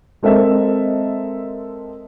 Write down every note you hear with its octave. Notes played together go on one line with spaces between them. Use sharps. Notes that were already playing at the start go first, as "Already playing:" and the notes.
G#3 C4 A4 A#4 D#5 E5